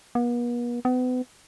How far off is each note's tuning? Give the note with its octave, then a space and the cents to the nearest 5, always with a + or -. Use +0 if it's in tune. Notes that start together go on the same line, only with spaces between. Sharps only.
B3 -45
B3 +35